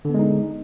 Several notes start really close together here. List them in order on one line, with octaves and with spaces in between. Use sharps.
D3 B3 G#3 D#4